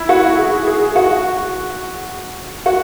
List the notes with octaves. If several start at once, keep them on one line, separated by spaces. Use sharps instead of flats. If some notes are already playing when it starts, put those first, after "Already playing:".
Already playing: E4
F#4
G#4
G#4
F#4
F#4